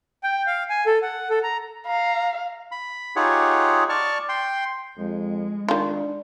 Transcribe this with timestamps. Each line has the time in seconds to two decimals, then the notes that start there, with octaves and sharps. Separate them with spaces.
0.24 G5
0.47 F5
0.70 G#5
0.86 A4
1.02 F#5
1.30 A4
1.43 A#5
1.86 F5 A#5
2.72 B5
3.16 D#4 F4 G4 G#4 C#5 F#5
3.89 D5 A5 C#6 F6
4.29 G5 C6
4.98 F2 G#3
5.69 D#3 D4 F4